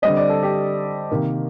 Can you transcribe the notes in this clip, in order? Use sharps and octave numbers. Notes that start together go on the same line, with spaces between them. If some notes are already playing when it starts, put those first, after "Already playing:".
D3 G3 C4 D#5
D5
A4
G4
C3 D#3 A#3